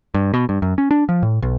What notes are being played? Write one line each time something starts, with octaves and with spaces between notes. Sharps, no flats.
G2
B2
G2
F#2
C#4
D4
F3
A2
B1